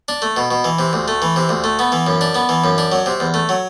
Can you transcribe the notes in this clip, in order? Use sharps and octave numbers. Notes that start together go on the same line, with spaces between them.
D4
A3
B2
B2
E3
C3
D2
A3
E3
C3
D2
A3
B3
E3
F#2
D4
B3
E3
F#2
D4
F#3
C3
E2
A3
F#3